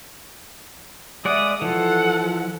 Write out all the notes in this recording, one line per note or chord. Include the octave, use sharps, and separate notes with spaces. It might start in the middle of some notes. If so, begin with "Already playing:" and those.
G#3 D5 E5 F#5 D#6
E3 F3 A4 F#5